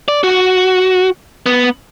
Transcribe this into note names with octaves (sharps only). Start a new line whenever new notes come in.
D5
F#4
B3